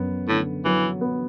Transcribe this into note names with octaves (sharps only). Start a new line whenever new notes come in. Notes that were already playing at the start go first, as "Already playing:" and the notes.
Already playing: F#2 B3
A2 D3
E3 F#3
B3